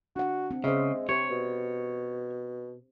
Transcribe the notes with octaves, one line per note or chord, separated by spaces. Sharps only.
D4 F#4 F#5
C4
C#3 G#3 C5 E5
C3 G4 C5 C#5
B2